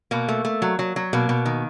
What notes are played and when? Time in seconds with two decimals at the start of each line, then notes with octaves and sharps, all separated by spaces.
0.11 B2 A#3
0.29 A3
0.45 A3
0.62 F#3
0.79 F#3
0.96 F#3
1.13 B2 A#3
1.29 B2
1.46 D#3